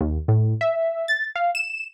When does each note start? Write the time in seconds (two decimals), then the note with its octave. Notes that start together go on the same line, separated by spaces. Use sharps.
0.01 D#2
0.28 A2
0.61 E5
1.08 A6
1.36 F5
1.55 E7